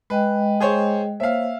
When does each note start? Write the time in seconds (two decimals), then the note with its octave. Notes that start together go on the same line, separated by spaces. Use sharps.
0.10 G#3 B4 D#5 G5
0.60 G#4 C5 C#5
1.20 A#3 C5 C#5 E5 F5